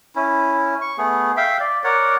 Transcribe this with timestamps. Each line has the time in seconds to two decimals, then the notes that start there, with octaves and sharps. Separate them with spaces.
0.15 C#4 E4
0.81 C#6
0.98 A3 B3 G#4
1.37 E5 F5 G5
1.60 D5
1.84 A#4 C#5 D5 F#5